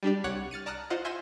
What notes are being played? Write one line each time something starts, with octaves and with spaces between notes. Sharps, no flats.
G3 D4 G4 D5
C2 C#5 F#5 D6 F#6 G#6
F6 A6 C#7 D#7
D5 A5 A#5 D#6 F6 F#6
F4 C5 D#5 F#5
E5 G#5 C6 G6 A#6 E7